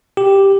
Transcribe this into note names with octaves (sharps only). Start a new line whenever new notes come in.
G4